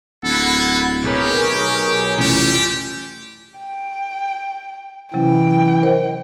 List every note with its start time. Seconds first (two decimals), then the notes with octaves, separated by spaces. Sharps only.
0.23 D1 A#3 A4 F#5 B5 G#6
1.04 B1 G4 G#4 A#4 B4 C#5
2.18 A1 G3 F4 G4 G#5
3.59 G5
5.14 C3 E3 F#3 C#4 G5
5.83 A#4 C5 D#5